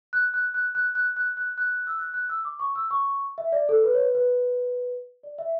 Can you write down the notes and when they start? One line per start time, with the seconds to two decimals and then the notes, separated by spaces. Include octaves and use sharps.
0.13 F#6
0.34 F#6
0.54 F#6
0.75 F#6
0.95 F#6
1.17 F#6
1.37 F#6
1.58 F#6
1.87 E6
1.98 F#6
2.14 F#6
2.29 E6
2.45 D6
2.60 C#6
2.76 E6
2.91 C#6
3.38 E5
3.52 D5
3.69 A4
3.84 B4
3.94 C#5
3.99 B4
4.15 B4
5.23 D5
5.39 E5